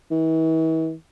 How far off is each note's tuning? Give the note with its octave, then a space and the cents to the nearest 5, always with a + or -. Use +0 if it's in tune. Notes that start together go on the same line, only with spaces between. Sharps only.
E3 -40